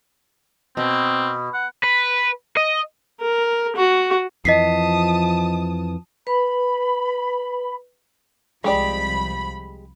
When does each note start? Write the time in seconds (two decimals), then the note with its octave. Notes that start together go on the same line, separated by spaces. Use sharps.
0.77 B2 C4
1.54 F#5
1.84 B4
2.57 D#5
3.21 A#4
3.76 F#4
4.45 F2 E3 F3 D#5 A5 D#6 B6 C7
6.27 B4 B5
8.64 C2 F3 G#3 G4 D5 B5